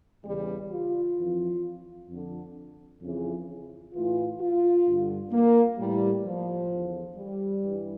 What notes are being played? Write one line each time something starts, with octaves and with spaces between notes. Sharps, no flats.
E2 C#3 E3 G3
F4
F2 E3
F2
D3
F2 C#3 E3
A2 E3 F4
F4
G2 D3
A#3
A2 E3 G3
F3
E2 D3
G3
G2 E3